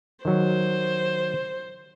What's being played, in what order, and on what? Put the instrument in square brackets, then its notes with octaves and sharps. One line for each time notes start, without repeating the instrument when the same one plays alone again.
[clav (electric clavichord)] D#3 F#3 [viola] C5